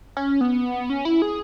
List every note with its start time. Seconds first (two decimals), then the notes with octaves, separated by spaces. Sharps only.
0.17 C#4
0.41 B3
0.90 C#4
1.05 E4
1.22 G#4